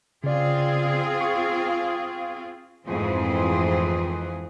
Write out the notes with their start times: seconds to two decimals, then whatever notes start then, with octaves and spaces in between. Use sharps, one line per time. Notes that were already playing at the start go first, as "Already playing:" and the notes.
0.24 C#3 C4 F4 G#4 D5
1.21 C#6
2.87 F2 G#2 E3 A3 C4 G#4